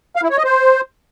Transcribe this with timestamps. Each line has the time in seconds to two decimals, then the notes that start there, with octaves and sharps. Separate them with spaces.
0.16 F5
0.23 E4
0.30 C#5
0.37 D#5
0.44 C5